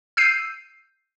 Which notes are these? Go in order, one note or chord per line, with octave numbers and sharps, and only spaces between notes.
E6 G6 C7 D#7